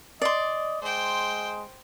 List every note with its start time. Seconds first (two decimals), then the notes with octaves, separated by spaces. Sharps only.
0.22 D5 D#5 C6
0.82 G#3 C5 G5